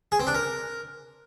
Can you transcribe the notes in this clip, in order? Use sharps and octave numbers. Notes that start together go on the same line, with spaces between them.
G#4
C4
D4
A#4